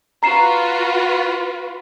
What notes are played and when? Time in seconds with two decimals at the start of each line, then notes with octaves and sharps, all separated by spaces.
0.23 F4 F#4 B4 A#5 C7 E7